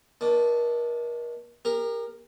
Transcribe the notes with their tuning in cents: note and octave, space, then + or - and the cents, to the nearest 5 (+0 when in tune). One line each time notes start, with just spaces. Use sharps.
D#3 +35 D4 +0
G4 +45 A#4 +0